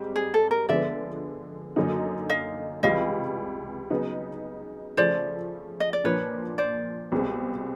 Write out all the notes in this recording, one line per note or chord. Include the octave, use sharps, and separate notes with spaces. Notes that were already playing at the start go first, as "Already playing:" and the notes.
Already playing: G#2 G3 C4
G#4
A4
A#4
D3 F3 G#3 B3 D5 E5
F#2 D3 F#3 A#3 D#4
D#5 F5
C#2 C3 E3 G3 D#5 F5
C#3 F#3 B3 D#4
C#3 F3 A3 C5 D5
D#5
D5
A#2 F3 A#3 D4 B4 C#5
C5 D5
C2 B2 G#3 C4